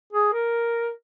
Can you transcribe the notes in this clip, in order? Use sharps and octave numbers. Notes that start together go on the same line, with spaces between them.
G#4
A#4